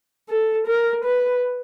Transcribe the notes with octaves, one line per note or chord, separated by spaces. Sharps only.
A4
A#4
B4